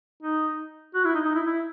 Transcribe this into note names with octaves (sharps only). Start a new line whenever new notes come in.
D#4
F#4
E4
D#4
D#4
E4
E4